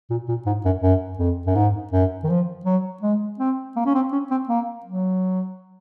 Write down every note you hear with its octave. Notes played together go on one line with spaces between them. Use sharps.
A#2
A#2
G#2
F#2
F#2
F2
F#2
G#2
F#2
D#3
F3
F#3
G#3
C4
A#3
C#4
C4
C#4
C4
A#3
F#3